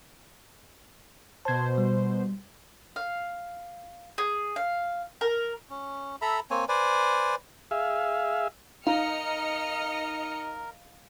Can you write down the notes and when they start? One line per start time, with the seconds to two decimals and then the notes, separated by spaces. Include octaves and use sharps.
1.45 B2 C5 A5 G#6
1.78 G3
2.96 F5
4.18 G#4
4.56 F5
5.21 A#4
5.70 C#4
6.22 A4 E5 A#5 B5
6.51 A#3 C4 C#5 G#5
6.69 B4 C5 D5 G#5
7.71 G#4 E5 F5
8.87 D#4 A#4 D#5 F5 F6 C#7